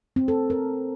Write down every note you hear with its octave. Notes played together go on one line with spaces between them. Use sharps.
C4
A4
A#4